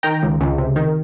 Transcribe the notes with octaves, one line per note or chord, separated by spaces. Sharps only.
D#3 G5 A#5
C#2
C#2
C3
D#3